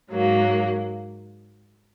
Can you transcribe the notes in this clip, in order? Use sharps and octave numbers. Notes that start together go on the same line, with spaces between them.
G#2 F#3 A#3